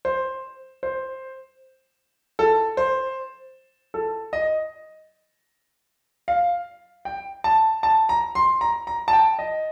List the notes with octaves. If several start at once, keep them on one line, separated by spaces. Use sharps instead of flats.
C5
C5
A4
C5
A4
D#5
F5
G5
A5
A5
A#5
C6
A#5
A#5
A5
G5
D#5